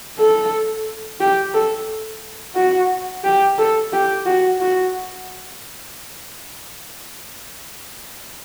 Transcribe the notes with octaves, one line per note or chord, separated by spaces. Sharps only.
A4
G4
A4
F#4
G4
A4
G4
F#4
F#4